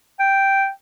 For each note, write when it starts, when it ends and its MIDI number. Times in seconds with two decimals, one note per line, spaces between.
0.19 0.69 79